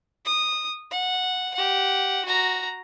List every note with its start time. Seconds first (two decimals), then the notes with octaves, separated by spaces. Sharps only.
0.25 D#6
0.91 F#5
1.54 G4 F#5
2.25 F#4 A#5